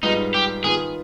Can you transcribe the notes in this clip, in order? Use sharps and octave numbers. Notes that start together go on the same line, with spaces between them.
G#2 G3 B3 D#4 F4
G4
D#3 B3 F4 G#4